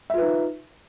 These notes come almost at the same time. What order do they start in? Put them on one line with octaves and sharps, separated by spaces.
E5 F4 B4 D#4